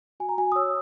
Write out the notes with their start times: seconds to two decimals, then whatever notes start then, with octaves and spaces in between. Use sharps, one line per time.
0.20 F#4 G#5
0.29 A#5
0.38 F#4 G#5
0.52 D#6
0.56 C#5 E6